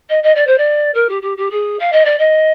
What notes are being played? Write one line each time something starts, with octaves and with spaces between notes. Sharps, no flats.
D#5
D#5
D5
C5
D5
A#4
G4
G4
G4
G#4
F5
D#5
D5
D#5